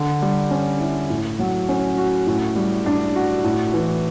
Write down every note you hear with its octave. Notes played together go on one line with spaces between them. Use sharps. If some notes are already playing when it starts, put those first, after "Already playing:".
Already playing: D3
G3
C#4
E4
A2
F#3
C#4
F#4
A2
G3
D4
F#4
A2
E3